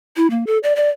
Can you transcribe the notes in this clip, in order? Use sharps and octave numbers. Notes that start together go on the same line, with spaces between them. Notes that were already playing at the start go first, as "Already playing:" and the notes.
E4
A#3
A4
D5
D5